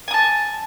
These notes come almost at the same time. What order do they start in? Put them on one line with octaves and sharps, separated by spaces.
G#5 D#6 A5